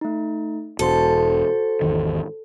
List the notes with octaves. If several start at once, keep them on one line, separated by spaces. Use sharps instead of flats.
A3 D#4
E1 F#4 A4 C5 C6
G#1 E2 D#3